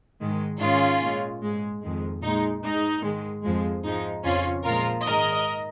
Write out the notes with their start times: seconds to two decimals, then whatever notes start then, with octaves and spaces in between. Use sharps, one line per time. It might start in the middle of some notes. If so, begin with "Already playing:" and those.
0.20 G#2 D#3 G#3
0.60 G#2 D#3 G#3 C#4 F4
1.01 A#2 G#3
1.42 G#2 G#3
1.82 F2 D#3 G#3
2.22 A#2 G#3 D#4
2.63 G#2 G#3 D#4
3.04 G#2 D#3 G#3
3.44 F2 F3 G#3
3.85 G#2 F3 G#3 D#4
4.24 F2 C#3 F3 C#4 F4
4.64 A#2 F3 G#3 F4 A#4
5.05 G#2 D#3 G#3 A#4 D#5